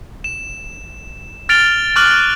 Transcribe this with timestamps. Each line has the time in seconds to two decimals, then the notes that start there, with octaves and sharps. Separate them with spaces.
0.24 E7
1.49 F6 A6 D7 F7 G7
1.96 C#6 D6 F6 F#6 F#7